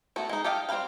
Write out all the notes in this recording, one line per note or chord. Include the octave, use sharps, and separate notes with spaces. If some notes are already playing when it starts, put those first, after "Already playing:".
A3 B3 F#4
G#3 D#4
G4 A4 D#5 F5 G5
G3 C4 F4 B4 F5